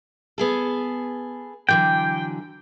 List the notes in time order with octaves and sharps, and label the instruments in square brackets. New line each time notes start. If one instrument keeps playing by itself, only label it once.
[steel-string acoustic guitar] B3 G#4 A4
[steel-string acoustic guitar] D3 E3 F#3 [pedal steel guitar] G5